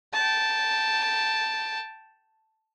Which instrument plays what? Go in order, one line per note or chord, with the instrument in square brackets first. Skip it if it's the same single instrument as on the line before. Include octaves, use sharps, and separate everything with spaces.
[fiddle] G5 A5